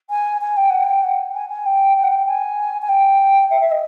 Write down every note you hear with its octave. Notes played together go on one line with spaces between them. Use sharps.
G#5
G#5
G5
F#5
G5
F#5
G#5
G#5
G5
G5
F#5
G5
G#5
G#5
G5
E5
E5
D#5